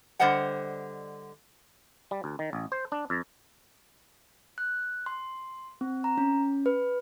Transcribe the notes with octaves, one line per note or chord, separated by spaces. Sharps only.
D3 G3 C5 D#5 F#5 G5
G3
D2
D#3
A1
C5
D4
F2
F#6
C6
C4
A#5
C#4
B4